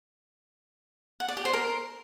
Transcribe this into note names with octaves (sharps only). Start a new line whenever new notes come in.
F#5
D5
G4
C5
A#4